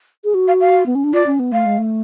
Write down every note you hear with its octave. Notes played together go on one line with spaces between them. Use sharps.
G#4
F#4
F5
F5
B3
C#4
D4
F4 D5
C#4
B3
A3 F5
G#3
A3